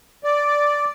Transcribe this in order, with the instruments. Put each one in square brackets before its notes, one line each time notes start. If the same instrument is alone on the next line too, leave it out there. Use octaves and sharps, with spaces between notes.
[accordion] D5